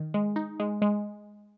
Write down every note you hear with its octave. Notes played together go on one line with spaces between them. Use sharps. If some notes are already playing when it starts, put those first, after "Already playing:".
Already playing: D#3
G#3
D#4
G#3
G#3